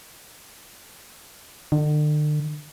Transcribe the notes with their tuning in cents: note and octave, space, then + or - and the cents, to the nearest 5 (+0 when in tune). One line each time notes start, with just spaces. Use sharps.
D3 +40